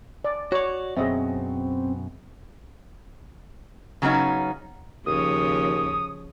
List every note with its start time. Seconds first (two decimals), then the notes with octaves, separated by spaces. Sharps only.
0.24 D5
0.52 F#4 C#5 D5
0.97 F#2 B2 C4 G#4 D#5 E5
4.02 C#3 F#3 B3 C#4 D#4
5.06 D#2 C#3 F3 C#5 D#6